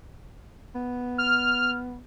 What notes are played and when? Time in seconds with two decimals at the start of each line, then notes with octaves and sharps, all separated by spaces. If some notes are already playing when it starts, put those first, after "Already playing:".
0.75 B3
1.18 F6